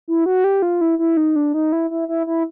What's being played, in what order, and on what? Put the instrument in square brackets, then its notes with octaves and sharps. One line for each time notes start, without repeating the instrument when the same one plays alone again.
[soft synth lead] E4
F#4
G4
F4
E4
E4
D#4
D4
D#4
E4
E4
E4
E4